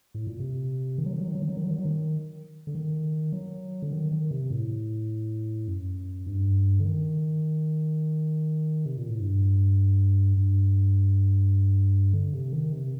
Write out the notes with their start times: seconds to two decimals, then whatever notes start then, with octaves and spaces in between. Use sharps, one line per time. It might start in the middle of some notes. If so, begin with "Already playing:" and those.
0.14 A2
0.27 A#2
0.40 C3
0.98 D#3
1.06 F#3
1.13 D#3
1.21 F#3
1.28 D#3
1.35 F#3
1.42 D#3
1.49 F#3
1.57 D#3
1.64 F#3
1.71 D#3
1.78 F#3
1.85 D#3
2.67 D3
2.75 D#3
3.32 F#3
3.82 D3
3.92 D#3
4.11 D#3
4.31 C3
4.50 A2
5.68 F#2
6.26 G2
6.80 D3
6.85 D#3
8.85 C3
8.97 A#2
9.09 A2
9.20 G2
10.37 G2
12.14 D3
12.33 C3
12.53 D#3
12.72 C3